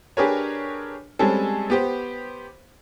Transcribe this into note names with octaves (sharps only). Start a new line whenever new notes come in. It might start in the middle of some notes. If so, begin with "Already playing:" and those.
D4 G4 G#4 A#4 B4 C#5
G3 G#3 C4 C#4 G#4 A4
B3 G4 C5